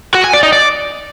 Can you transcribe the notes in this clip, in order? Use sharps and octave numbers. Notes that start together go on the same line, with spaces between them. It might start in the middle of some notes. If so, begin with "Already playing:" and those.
F#4
G#5
D5
D#4
D5